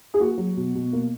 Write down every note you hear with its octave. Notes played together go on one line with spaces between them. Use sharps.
G#4
A#3 F#4
F#3
B2
B2
A#3